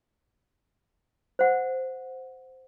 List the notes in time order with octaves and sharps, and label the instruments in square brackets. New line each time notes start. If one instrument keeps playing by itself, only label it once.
[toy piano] C5 F#5